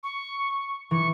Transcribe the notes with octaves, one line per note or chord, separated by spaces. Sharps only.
C#6
E3 C#6